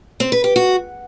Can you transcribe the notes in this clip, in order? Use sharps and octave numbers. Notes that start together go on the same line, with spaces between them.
C4
B4
G4
F#4